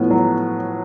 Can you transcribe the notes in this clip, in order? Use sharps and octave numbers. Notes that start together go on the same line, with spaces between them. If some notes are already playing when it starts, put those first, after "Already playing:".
Already playing: A2 F3 B3
F#3